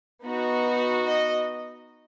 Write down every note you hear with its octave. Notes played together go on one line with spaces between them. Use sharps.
B3 D#4 F#4
D#5